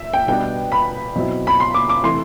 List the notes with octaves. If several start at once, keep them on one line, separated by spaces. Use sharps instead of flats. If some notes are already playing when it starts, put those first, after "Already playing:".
Already playing: E5
G5
B2 G3 B3 D4 G5
B5
B2 F#3 C4 E4
B5
C6
D6
D6
C3 E3 A3 E4 C6